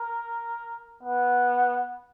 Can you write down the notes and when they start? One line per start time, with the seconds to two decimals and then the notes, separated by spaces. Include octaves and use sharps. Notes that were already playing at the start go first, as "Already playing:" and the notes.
Already playing: A#4
1.03 B3